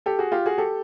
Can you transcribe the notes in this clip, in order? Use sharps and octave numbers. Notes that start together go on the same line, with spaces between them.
G4 A4
F#4 G#4
F4 G4
F#4 G#4
G4 A4